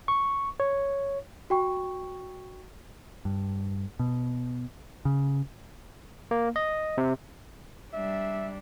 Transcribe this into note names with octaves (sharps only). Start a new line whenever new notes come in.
C#6
C#5
F#4 G5 C#6
G2
B2
C#3
A#3
D#5
C3
G3 D4 E5